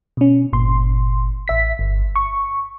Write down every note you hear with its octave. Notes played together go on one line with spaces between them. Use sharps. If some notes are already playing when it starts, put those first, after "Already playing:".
B2 C#4
G1 A#2 C6
A1 E5 B6
G1
C#6